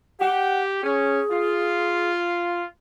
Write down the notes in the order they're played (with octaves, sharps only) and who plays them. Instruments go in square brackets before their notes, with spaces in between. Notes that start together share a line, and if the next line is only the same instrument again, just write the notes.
[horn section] G4 [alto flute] F#5
[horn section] C#4 [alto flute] G#4
[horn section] F4